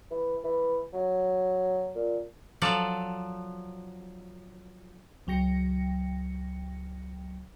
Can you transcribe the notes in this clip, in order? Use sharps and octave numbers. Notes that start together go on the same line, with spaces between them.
E3
E3
F#3
A#2
F3 F#3 A4 D5
C#2 F#3 G5 A#6 C#7